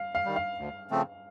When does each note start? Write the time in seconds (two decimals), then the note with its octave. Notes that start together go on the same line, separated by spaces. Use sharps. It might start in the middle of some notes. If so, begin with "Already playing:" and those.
Already playing: F5
0.15 F5
0.25 D#3 G3
0.36 F5
0.58 D2
0.91 C#3 F3 A3 C4